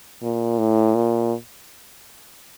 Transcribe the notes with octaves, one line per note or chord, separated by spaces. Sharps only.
A#2
A2
A#2